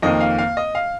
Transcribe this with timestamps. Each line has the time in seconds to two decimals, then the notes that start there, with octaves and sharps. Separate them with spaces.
0.02 F2 D#3 A#3 D#5
0.21 F5
0.38 F5
0.57 D#5
0.75 F5